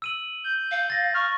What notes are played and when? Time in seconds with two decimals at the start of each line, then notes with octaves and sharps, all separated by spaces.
0.02 E6 D#7 F#7
0.44 G6
0.71 F5
0.90 A6 A#6
1.14 C#6 F6